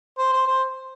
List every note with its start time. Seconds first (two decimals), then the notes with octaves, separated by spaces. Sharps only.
0.18 C5
0.33 C5
0.47 C5